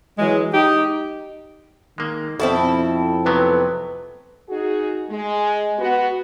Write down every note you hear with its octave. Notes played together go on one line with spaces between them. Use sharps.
E3 F#3 G#3
D#4 G4
D#3 G#3 A#3
F2 B2 C4 E4 A4
C3 F#3 B3 B4
D#4 F#4 G#4
G#3
B3 F#4